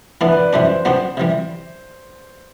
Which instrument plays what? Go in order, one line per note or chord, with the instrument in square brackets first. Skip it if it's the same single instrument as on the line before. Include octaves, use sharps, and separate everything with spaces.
[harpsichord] E3 B3 D4
[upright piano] B4
D5
[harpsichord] F#2 E3 G3 D4 [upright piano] C5
[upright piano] C5
[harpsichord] F#3 B3 D4 G4 [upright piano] C5
[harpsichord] C3 E3 G3